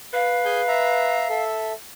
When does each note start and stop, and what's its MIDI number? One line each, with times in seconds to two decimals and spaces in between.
0.14 1.40 71
0.14 1.43 77
0.45 0.61 68
0.45 0.61 80
0.45 0.61 91
0.68 1.27 76
0.68 1.27 82
1.30 1.73 69
1.30 1.73 76